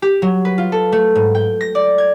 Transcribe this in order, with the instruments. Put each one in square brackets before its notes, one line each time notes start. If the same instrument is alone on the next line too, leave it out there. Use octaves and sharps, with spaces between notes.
[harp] G4
F#3
B4
F4
A4
A3
G#2
G5
A#6
D5
G#6